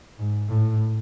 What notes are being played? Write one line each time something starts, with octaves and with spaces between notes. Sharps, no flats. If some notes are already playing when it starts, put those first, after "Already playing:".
G#2
A2